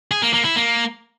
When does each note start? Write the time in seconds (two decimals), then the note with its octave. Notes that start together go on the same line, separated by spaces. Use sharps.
0.11 G#4
0.22 A#3
0.34 A#3
0.45 E4
0.56 A#3